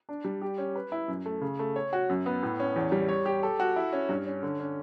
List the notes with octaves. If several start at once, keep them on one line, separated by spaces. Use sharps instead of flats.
D4
G3
G4
C#4
B4
E4
F#2
A3
C#3
A3
C#5
F#4
F#2
B3
A2
C#4
E2
G3
C#5
G4
A4
F#4
E4
C#4
G2
C#4
D3
C#4